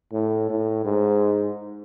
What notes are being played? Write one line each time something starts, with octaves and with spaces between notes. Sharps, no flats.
A2
A2
G#2